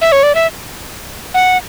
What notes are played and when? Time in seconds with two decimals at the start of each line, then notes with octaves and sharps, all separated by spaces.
0.01 E5
0.12 C#5
0.23 D5
0.35 E5
1.34 F#5